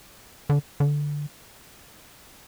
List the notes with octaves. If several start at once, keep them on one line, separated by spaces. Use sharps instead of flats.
D3
D3